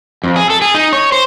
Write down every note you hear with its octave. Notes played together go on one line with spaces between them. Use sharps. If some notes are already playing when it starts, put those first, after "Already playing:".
F2
G#4
A4
G#4
D#4
C#5
C5